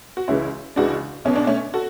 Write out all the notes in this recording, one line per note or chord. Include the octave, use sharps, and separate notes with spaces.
F#4
C#2 C#3 E3 C#4 E4
C#2 C#3 E3 D4 F#4
B1 B2 C#4
D4
A3 C#4
F#4 A4